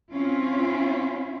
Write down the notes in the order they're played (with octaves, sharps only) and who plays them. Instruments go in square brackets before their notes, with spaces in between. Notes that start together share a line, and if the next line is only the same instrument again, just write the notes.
[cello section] C4 C#4 E4 F4